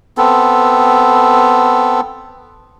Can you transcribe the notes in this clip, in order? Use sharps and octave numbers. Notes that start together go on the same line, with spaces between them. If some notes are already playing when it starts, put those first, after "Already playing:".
B3 C4 A4